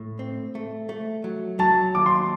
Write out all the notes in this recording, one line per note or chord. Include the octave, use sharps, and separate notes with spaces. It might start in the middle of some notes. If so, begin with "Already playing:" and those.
Already playing: A2
C4
A3
A3
F#3
F#3 A5
D#2 D6
C6